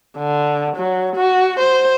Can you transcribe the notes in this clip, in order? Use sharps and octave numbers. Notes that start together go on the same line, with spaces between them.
D3
F#3
F#4
C5